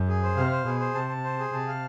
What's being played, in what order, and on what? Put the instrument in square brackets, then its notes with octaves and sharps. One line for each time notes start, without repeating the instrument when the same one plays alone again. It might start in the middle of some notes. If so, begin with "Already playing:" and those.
Already playing: [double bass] F#2
[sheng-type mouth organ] G#4
C5
[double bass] C3 [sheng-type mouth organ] F5
[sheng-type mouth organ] C5
[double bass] B2 [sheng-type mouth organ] G#4
[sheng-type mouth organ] C5
[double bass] C3 [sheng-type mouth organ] A5
[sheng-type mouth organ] A5
C5
G#4
[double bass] C3 [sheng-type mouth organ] A5
[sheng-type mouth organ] F5